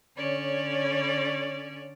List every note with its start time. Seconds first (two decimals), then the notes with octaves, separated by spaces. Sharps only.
0.16 D3 C#4 C#5 D5